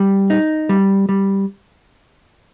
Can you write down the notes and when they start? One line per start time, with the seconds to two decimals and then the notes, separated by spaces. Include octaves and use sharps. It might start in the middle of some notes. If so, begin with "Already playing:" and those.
Already playing: G3
0.30 D#4
0.69 G3
1.09 G3